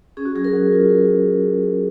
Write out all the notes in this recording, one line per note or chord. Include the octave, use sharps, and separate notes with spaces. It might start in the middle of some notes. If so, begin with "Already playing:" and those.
C#4 G#4
F#4
F#3 G#4
A#4
F#3
F4